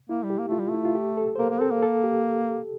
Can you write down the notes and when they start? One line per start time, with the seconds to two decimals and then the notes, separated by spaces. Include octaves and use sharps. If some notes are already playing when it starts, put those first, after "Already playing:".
0.09 A#3 E4
0.23 G3
0.30 G4
0.38 A#3
0.48 A3 F4
0.59 G3
0.69 A3
0.75 E4
0.85 F4
0.95 G4
1.17 A4
1.36 C5
1.39 A#3 A#4
1.50 A#3
1.61 C4 A4
1.71 A#3
1.82 A4
2.04 G4